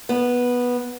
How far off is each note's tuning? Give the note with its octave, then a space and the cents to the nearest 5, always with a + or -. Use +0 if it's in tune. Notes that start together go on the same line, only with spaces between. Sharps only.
B3 -10